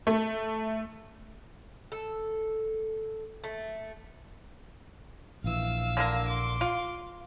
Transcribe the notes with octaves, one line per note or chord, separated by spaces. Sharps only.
A3
A4
A3
A#1 E3 F5 E6
D3 A#3 A#4
C6 D6
F4